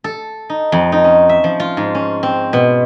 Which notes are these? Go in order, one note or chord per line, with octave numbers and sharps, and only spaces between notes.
A4
D#4
F2
D#4
C#4
E5
F3
F4
G#2
C#4
C4
B2